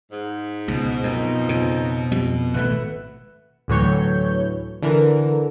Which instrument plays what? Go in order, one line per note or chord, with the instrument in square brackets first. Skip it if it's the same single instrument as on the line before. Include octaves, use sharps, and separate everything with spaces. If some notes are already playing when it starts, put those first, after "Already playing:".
[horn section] G#2
[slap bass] C#2 [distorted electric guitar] B2
[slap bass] F#2 [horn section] F3 C4 D#4
[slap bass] F2 C#3
F2 G3
[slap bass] G#1 A2 A3 [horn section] B4 E5 F#5
[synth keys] D2 A2 E3 F#3 C#5 G6
D3 E3 A#4